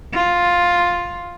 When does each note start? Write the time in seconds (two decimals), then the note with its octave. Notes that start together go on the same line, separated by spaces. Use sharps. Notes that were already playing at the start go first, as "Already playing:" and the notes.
0.13 F4